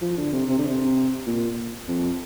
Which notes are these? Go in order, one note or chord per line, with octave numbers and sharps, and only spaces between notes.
F3
D3
C3
C3
D3
C3
A#2
F2